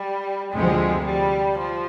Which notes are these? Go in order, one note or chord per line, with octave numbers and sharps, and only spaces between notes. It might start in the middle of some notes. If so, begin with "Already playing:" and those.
Already playing: G3
D2 C3 F3 G#3
G3
F3